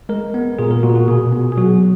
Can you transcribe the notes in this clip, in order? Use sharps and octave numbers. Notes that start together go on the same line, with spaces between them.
G#3 A#4
B3
A#2 G#4
A#4
A#2 F#4
F#4
B2 G#4
B3
G#4
F#3 F#4